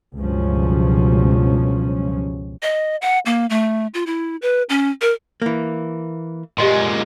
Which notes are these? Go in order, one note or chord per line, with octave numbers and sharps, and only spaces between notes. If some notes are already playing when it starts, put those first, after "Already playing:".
C#2 G2 B2 F3 F#3 C#4
D#5
F#5
A#3
A3
F4
E4
B4
C#4
A#4
E3 A#3
A#2 G#3 G4 D#5 C6